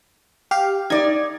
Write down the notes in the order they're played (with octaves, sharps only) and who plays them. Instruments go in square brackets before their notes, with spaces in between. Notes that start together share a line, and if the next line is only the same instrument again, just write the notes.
[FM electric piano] G4 F5
[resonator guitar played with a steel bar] D#4 D5 [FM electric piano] G#6